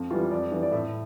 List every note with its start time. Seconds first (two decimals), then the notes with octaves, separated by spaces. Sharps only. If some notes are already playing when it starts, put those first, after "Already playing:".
Already playing: F2
0.11 E3 G3 F4
0.31 F2 D5
0.52 E3 G3
0.62 D5
0.72 A2 E5